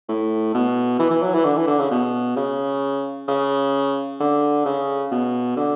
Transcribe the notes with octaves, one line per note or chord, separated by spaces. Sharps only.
A2
B2
E3
E3
F#3
E3
D3
E3
D3
C#3
B2
C#3
C#3
D3
C#3
B2
D3